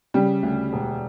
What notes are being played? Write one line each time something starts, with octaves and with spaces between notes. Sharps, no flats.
C#3 G3
D2
E1